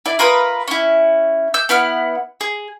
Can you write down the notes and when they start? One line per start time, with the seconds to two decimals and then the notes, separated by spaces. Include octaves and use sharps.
0.06 E4 D5
0.19 F4 A#4 B4 D#6
0.68 C#4 E4
1.54 E6 G6
1.69 B3 E4 F#5 F6
2.41 G#4